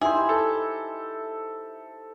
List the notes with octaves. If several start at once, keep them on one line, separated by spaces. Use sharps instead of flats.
D#4 E4 G4 G#4 C5 E5
A4